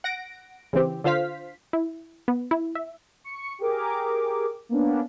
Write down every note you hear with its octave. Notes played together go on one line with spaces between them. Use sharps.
F#5 A#6 D7
C#3 E3 C4 G4
D3 F4 C5 F5 B6
E4
B3
E4
E5
C#6 C#7
G4 G#4 A#4 D6
A#3 B3 C#4 D4